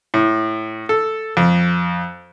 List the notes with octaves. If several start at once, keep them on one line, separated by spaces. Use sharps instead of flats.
A2
A4
F2